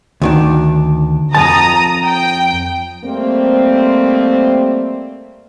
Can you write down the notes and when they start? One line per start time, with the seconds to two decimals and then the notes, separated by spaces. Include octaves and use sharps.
0.22 D2 D#3 D4
1.35 F2 D#3 A5 A#5 D#6
2.06 G5
3.04 G3 A3 A#3 C4